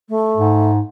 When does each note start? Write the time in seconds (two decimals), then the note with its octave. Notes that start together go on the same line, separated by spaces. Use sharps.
0.09 A3
0.37 G#2